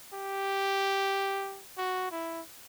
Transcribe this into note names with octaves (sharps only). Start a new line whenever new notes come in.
G4
F#4
E4